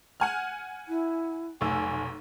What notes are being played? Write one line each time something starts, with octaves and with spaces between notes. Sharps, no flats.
F#5 G#5 F6
E4
F1 B1 G#5 E6